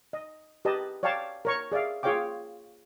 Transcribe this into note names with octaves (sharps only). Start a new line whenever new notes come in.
D#5
G4 B4 D#5 A5
C#5 D5 F5 G5 A5 D6
A#4 C#5 C#6
G#4 D5 E5 F5
F4 G#4 C#5 F5 G5 D6